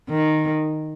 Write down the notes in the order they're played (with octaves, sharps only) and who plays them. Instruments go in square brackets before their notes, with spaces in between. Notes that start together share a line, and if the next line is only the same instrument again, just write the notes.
[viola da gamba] D#3